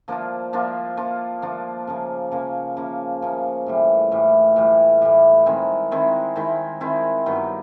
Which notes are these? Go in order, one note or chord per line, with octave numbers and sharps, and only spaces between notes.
F3 A#3 D4 F4
F3 A#3 D4 F4
F3 A#3 D4 F4
F3 A#3 D4 F4
C#3 F3 A#3
C#3 F3 A#3
C#3 F3 A#3
C#3 F3 A#3
A2 E3 G3
A2 E3 G3
A2 E3 G3
A2 E3 G3
D#3 G#3 C4 E4
D#3 G#3 C4 E4
D#3 G#3 C4 E4
D#3 G#3 C4 E4
G2 D#3 F#3 B3